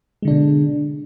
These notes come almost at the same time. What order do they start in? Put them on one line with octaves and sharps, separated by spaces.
G#3 D3 D4 B2